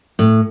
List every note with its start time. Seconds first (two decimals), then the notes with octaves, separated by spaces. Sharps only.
0.19 A2